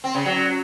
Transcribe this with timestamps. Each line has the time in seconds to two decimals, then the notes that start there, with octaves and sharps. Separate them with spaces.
0.04 C4
0.15 C#3
0.26 F#3